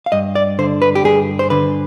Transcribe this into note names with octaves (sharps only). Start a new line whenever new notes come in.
F5
G2 D#5
D5
D3 C5
B4
G4
G2 G#4
C5
D3 B4